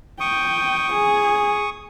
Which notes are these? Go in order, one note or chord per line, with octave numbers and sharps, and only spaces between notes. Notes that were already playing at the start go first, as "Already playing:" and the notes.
G5 C#6 D#6
G#4